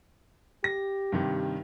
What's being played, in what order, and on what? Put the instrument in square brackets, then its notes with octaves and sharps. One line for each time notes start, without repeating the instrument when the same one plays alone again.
[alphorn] G4 [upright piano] A#6
[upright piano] G2 C3 D#3